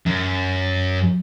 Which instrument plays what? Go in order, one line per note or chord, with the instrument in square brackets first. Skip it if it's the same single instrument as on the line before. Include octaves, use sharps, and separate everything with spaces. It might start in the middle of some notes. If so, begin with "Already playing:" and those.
[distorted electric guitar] F#2